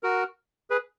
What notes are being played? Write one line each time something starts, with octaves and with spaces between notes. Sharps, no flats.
F#4 A#4
G#4 B4